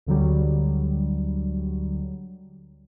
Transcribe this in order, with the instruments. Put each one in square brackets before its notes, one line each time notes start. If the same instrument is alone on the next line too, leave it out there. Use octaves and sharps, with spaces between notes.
[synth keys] D2 D3 F#3 G3